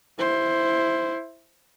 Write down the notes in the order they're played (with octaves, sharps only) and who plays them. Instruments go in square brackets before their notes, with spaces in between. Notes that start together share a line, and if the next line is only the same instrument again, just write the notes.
[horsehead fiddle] E4 C5